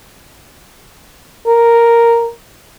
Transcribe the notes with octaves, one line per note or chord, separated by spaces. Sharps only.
A#4